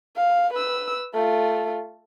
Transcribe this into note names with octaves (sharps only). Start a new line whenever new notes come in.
F5
B4 E6
A3 F4